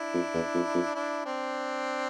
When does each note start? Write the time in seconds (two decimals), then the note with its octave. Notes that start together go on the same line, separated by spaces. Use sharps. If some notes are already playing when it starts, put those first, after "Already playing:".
Already playing: D4 E4
0.14 F2
0.34 E2
0.55 F2
0.74 F2
0.94 D4 E4
1.25 C4 D4